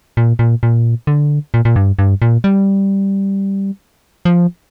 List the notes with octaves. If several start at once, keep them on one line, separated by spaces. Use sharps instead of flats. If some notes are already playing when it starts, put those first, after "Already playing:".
A#2
A#2
A#2
D3
A#2
A#2
G2
G2
A#2
G3
F3